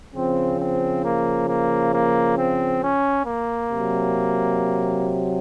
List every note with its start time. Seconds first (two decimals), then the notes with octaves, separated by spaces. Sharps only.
0.15 C#3 F3 C4
0.59 C4
1.04 A#3
1.49 A#3
1.93 A#3
2.38 C4
2.83 C#4
3.26 A#3
3.71 C3 F#3